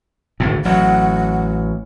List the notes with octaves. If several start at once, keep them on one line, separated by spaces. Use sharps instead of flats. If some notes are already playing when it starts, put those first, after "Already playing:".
G#1 D2 A2
A1 F#3 F#5